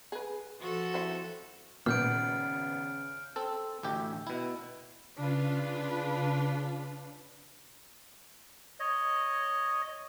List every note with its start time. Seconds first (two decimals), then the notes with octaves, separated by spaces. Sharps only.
0.12 G#4 B4
0.59 F3 F#4 A4
0.94 C4 E4 C5
1.86 G#1 A#2 C#3 B3 F6 G6 D7
3.36 C4 A4
3.83 A1 D2 G4 E5
4.27 B2 E4
5.17 C#3 D4 F4 B4
8.80 C#5 D#5